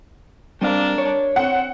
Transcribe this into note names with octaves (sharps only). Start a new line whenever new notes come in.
G3 C4 D4 A#4 F5
C#5
C4 F#5